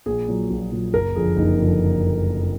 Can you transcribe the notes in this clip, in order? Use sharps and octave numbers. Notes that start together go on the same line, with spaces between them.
A#1 G#4
A#2 F#3
A#1
A#2 F#3
F#1 A#4
F2 D3 F3 G#4
F#1 D#4
F2 D3 F3